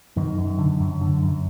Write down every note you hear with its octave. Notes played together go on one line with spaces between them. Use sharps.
F#2 D#3
F#2
D3
F#2
D3
F#2